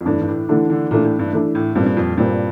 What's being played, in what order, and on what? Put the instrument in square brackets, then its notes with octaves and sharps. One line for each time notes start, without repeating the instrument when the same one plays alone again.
[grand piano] F2
[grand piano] G2 [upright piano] E3 A3 D4
[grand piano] G2
A2
[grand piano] D3 [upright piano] E3 A3 D4
[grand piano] D3
[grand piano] A#2 [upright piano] E3 A3 D4
[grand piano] A2
G2
[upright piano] E3 A3 D4
[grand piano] A2
[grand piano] G2 [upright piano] A#2 G3 C4
[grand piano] G2
F2
[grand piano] G2 [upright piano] A#2 G3 C4